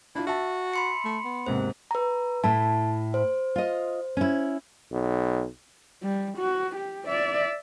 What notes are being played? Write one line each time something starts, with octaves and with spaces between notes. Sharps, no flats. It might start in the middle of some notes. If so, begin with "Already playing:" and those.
D4 E4 F4
F#4 E5 A5
B5 C6 C#7
A3
B3
D#2 G#2 C3 C5
B4 A#5
A2 E4 A5
C5
F4 D#5
C#4 E4
B1
G3
F#4
G4
D5 E5